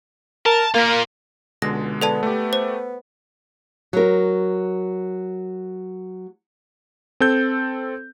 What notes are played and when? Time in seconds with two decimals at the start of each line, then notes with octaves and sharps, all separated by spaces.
0.46 A#4 A5
0.74 A#3 F4 A#4
1.62 C#2 B2 D3 G#3 A#6
2.02 B3 A4 D5 A5
2.23 A3 B3 G4
2.53 C5
3.93 F#3 A#4
7.20 C4 A4 G6